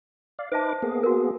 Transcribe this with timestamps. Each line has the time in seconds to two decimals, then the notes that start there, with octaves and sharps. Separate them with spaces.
0.39 D5 F5
0.52 D#4 B4 C5 E5 A5 D6
0.82 A#3 B3 G#4
1.03 F#4 A#4